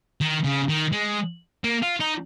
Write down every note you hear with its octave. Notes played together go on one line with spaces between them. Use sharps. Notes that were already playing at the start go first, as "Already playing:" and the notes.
D#3
C#3
D#3
G#3
A#3
F4
D#4